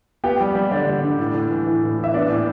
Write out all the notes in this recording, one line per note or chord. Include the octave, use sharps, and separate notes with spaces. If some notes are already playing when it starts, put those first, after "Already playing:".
B3 G4 G5
G3
G3
D3 D4 D5
G3
D3
A2
A2
E3
E3
A2
E3
E5
B3 D4 D5
A2